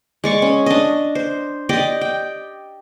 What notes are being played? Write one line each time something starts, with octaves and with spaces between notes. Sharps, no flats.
G#3 D5 C#6
C#4
D4 D#5
C5
G4 D5 D#5
G5